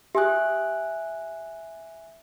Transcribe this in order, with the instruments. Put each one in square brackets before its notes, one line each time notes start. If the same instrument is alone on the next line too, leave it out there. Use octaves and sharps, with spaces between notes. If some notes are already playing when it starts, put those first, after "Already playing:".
[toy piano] G4 D#6 [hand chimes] E5 G#5 F#6